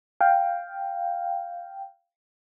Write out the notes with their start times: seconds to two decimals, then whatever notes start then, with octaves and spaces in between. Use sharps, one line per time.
0.21 F5 G5